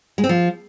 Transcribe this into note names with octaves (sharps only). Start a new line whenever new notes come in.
G#3
C4
F3